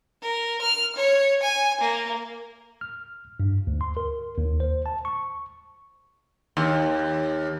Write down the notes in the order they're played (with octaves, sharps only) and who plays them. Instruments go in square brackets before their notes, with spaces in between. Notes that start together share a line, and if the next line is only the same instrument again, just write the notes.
[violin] A#4
F6
C#5
G#5
A#3
[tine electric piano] F6
G2
D2
C6
A#4
D#2
C5
A5
C#6
[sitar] D#2